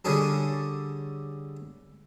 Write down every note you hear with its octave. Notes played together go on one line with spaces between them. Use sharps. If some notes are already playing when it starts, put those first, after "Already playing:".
D3 G3 C#4 G#4 A4